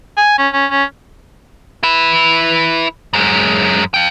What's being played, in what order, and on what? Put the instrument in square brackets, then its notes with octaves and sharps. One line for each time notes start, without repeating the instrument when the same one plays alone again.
[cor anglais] G#5
C#4
C#4
C#4
[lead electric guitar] E4 B4
F#2 G#3
F5 G5